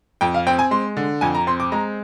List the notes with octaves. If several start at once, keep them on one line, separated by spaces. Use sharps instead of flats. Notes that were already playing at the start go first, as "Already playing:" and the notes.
F2 G5
F5
C4 G5
G#5
G#3 C6
D3
F2 G#5
A#5
C4 C6
D6
G#3 A#5